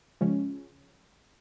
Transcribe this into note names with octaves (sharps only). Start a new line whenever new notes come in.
C#3 F3 G#3 C#4